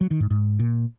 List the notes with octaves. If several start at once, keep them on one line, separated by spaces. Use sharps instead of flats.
F#3
D#3
G#2
G#2
A#2